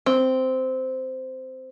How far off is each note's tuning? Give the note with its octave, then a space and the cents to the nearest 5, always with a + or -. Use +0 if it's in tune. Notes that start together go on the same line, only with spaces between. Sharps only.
C4 -10